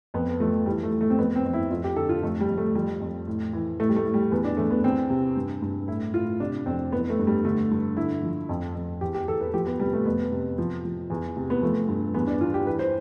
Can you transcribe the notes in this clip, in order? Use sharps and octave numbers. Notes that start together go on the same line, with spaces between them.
F2 B3
F3 A3
E3 G3
A3
E3
A3
C4
F2 B3
C4
F2
E4
F2 F4
G4
D3 A4
F4
F2 A3
G3
F2
A3
F3 G3
F2
A2
E3
A2 A3
G3
A3
A2
G3
E2 B3
D4
E2 A3
B3
E2 C4
C3
G2
G2
A2 E4
A2 F4
C3 D4
F2 C4
E3 B3
A3
G2
G3
D3 A3
G2
D3 E4
F3
F2
F2
E2 G4
G4
E2 A4
B4
F3 G4
B3
C3 G3
A3
F2 B3
C3
F3
F3
E2
C3
B3
F3 A3
G2
E2 B3
D4
E2 F4
G4
E3 B4
C5